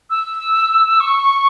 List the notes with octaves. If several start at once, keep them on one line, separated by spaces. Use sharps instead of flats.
E6
C#6